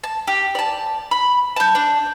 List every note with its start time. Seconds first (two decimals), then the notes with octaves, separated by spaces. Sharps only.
0.04 A5
0.28 G4
0.55 D5 A5
1.11 B5
1.56 A5 G6
1.75 D4